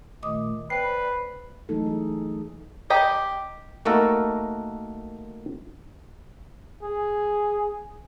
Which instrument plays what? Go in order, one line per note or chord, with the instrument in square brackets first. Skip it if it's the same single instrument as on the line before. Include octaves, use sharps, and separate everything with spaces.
[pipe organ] A#2 D#3 A3 [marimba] D#5 D6 D#6
[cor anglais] B4 [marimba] C5 G5 [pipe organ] D5 [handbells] C7
[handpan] E3 F#3 A3 D#4 A4
G#4
[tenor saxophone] G4 [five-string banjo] D#5 G5 A#5
[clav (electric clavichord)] A3 A#3 D#4 F#4 A4 A#4
[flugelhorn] G#4